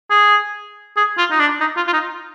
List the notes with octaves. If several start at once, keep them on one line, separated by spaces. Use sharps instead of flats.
G#4
G#4
F4
D#4
D4
D#4
F4
F4
D#4